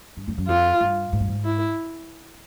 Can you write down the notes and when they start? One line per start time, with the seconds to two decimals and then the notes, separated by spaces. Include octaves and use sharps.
0.17 G2
0.28 F#2
0.38 F#2
0.48 F2 F4
0.80 G2
1.13 G#2
1.20 G2
1.28 G#2
1.44 E4